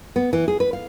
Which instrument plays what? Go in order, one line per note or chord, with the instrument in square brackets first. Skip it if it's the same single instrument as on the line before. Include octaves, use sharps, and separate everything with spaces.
[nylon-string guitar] B3
E3
G#4
B4
F5